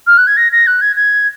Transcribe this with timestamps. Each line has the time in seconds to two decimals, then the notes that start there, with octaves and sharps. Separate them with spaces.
0.06 F6
0.17 F#6
0.27 G#6
0.36 A#6
0.52 A#6
0.66 F#6
0.81 G#6
0.96 G#6